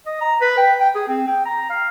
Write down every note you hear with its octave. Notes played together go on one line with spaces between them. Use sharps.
D#5
A#5
B4
G5
G5
G#4
C4
G5
A#5
F5